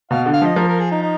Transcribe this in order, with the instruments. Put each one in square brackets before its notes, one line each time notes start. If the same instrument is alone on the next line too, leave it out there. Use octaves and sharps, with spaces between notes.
[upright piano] B2 [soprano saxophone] F5
[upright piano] D3
[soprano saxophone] F5
[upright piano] F3 [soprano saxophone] D#5
[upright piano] F3 [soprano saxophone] A#4
[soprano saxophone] A#4
G#4
D#4
D#4